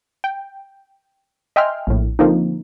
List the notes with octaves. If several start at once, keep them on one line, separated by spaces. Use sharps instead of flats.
G5
D#5 E5 G5 G#5 C6 F6
A#1 A2
D3 F3 A#3 C4 D#4